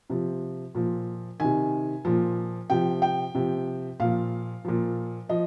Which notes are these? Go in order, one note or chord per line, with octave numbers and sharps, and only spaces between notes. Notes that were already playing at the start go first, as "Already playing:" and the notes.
C3 F3
A#2 F3
C3 D#3 G#5
A#2 F3
C3 F3 G5
G5
C3 F3
A#2 F3 F5
A#2 F3
F3 D#5